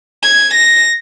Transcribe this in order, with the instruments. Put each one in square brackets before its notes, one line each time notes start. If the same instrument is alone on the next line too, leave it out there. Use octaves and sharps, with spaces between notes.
[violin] G#6
A#6